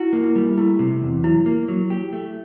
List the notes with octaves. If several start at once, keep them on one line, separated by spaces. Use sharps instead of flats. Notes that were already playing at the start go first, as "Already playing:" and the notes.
Already playing: E4 F#4
A#3
E4
G3
A3 E4
C3
E2
F#3 E4
A#3
F#3
G4
A3